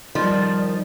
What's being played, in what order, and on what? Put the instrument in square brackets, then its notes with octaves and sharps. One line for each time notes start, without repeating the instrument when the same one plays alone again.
[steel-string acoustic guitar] D#3 [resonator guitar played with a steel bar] F3 [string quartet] G3 [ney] D5